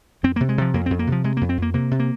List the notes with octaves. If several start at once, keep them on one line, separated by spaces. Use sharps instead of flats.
F2 C4
A#3
C3
G#3
C3 F3
F2 A#3
C4
F2
A#3
C3 F3
C3 G#3
A#3
F2
C4
F2 A#3
C3 A#3
C3
A#3